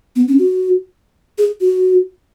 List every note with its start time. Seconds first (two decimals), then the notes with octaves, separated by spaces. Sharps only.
0.16 B3
0.28 C#4
0.39 F#4
1.38 G#4
1.61 F#4